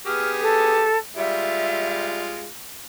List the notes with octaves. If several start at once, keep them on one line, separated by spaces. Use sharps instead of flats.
B3 G4 G#4 F6
A4
G3 G#3 F4 E5